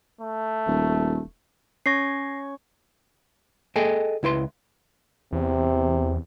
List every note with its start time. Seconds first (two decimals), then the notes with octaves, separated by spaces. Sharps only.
0.21 A3
0.67 D#1
1.86 C#4 C#5 C#6 A#6 C7
3.76 G#4 A4 D#5 G5 G#5
4.23 C#2 E4 B4 C6
5.32 E2 C3